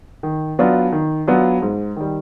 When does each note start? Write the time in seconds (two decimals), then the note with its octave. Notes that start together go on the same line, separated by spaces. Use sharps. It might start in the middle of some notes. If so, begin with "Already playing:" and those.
0.23 D#3
0.59 F#3 B3 D4 F4
0.92 D#3
1.27 F#3 B3 D4 F4
1.62 G#2
1.96 D#3 G3